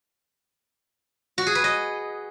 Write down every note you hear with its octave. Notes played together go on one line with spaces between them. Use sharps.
F#4
G#4
B4
D#5